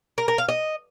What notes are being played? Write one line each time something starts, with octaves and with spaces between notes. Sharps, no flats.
A#4
A#4
F5
D#5